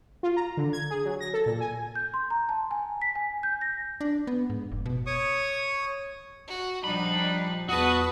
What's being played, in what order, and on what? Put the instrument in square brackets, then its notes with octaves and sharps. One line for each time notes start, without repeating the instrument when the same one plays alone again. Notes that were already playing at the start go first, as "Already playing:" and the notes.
[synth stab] F4
A#5
D3
G#6
G#4
F#3
A#6
A4
A#2
G#5
[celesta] G6
C6
A#5
A5
G#5
B6
G#5
G6
A#6
[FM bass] D4
B3
G#2
F1
B2
[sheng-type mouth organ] C#5 C#6 D#6
[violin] F#4
[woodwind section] A#2 F3 G3 [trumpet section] D4 [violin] D#4 [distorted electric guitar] B5
[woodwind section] E2 [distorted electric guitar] F#4 [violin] B4 A5 [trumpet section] D#6